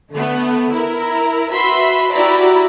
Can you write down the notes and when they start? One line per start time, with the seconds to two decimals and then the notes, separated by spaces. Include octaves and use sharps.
0.12 D3 A3 B3
0.72 E4 A#4
1.52 F#4 B4 E5 B5 C6
2.14 E4 F#4 G4 D5 A#5 B5